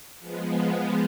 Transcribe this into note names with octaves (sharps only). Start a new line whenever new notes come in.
F3 G#3 B3